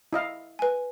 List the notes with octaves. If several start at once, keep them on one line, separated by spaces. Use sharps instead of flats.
E4 D#5 F5
B4 G#5